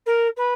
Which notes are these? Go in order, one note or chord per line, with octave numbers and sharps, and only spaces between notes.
A#4
B4